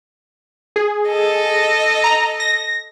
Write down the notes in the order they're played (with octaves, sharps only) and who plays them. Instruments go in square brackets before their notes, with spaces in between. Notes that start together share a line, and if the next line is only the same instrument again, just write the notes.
[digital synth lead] G#4
[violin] A4 D#5
[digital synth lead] A#5
A#6